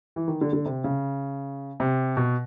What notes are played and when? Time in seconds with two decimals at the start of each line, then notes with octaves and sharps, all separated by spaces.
0.16 E3
0.28 D#3
0.41 D3
0.53 D3
0.65 C3
0.84 C#3
1.80 C3
2.17 B2